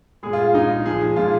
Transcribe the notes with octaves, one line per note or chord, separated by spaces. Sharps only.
A#2 G#3 G#4
F4
F4
A#2 G#3 D#4
A#2 F3 G#3 G#4
A#2 F3 G#3 F4